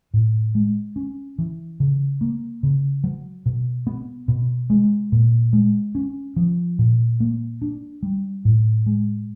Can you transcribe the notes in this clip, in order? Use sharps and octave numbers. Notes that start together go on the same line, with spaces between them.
A2
G#3
C#4
E3
C#3
A#3
C#3
F#3
B2
B3
B2
G#3
A#2
G#3
C#4
F3
A#2
A#3
D4
G3
A2
G#3